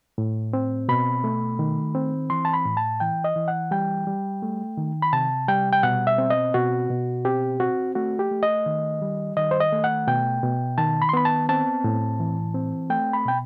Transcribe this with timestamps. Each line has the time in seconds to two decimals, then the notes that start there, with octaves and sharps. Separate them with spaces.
0.18 A2
0.53 C4
0.89 B2 B5
1.24 A3
1.59 D#3
1.95 C4
2.30 E3 C6
2.45 A5
2.53 B5
2.65 A2
2.77 A5
3.00 E3 G5
3.24 D#5
3.36 E3
3.48 F#5
3.71 G3 G5
4.07 G3
4.42 A3
4.77 D#3
5.02 B5
5.13 C3 A5
5.48 G3 G5
5.73 G5
5.83 B2 F#5
6.07 E5
6.18 C4
6.30 D#5
6.54 B2 F#4
6.90 B2
7.25 C4 G4
7.60 C4 F#4
7.95 A3 F#4
8.19 G4
8.31 A3
8.43 D#5
8.66 D#3
9.02 G3
9.37 D#3 D#5
9.51 C5
9.60 D#5
9.72 A3
9.84 F#5
10.07 B2 G5
10.43 B2
10.78 D#3 A5
11.02 B5
11.09 C6
11.13 B3 B5
11.25 A5
11.49 C4 A5
11.84 A2
12.20 E3
12.55 C4
12.90 A3 G5
13.13 B5
13.25 B2 G5